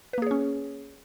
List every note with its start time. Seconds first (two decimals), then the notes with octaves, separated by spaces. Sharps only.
0.13 B4
0.18 A#3
0.22 G#4
0.27 C#5
0.31 C#4